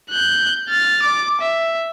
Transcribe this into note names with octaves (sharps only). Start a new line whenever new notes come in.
F#6 G6
F6 A6
D6
E5